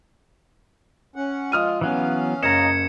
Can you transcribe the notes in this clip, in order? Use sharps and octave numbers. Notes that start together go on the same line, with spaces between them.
C#4 F#5
F3 G#3 F4 D#6 F6 D#7
E3 F#3 B3 C#4 F5
F#1 D#5 A#5 G#6 C#7 E7